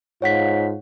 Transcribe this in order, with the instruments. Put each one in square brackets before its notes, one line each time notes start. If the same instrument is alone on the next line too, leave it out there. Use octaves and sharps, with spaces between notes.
[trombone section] G#2 F4 [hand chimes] C#5 F#5 B6